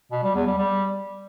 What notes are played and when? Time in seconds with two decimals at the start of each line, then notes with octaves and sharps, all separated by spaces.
0.12 B2
0.23 G3
0.35 E2
0.46 G3
0.58 G3